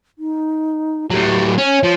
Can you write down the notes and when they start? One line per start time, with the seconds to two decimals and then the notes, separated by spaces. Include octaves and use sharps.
0.19 D#4
1.11 A2 F#3 G4
1.58 C#4 C#5
1.83 F3